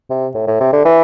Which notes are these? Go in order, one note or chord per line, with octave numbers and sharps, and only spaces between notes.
C3
A2
A2
C3
D3
E3